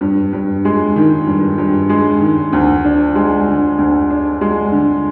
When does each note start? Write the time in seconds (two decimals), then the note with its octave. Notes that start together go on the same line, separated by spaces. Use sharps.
0.01 G2
0.33 G2
0.65 G#3
0.96 D#3
1.27 G2
1.58 G2
1.89 G#3
2.21 D#3
2.53 D2
2.85 D4
3.15 G#3
3.48 D3
3.78 D2
4.10 D4
4.41 G#3
4.72 D3